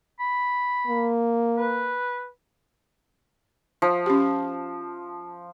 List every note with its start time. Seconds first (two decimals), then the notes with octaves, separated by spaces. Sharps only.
0.20 B5
0.87 A#3
1.57 B4
3.82 F3
4.06 C#4 G4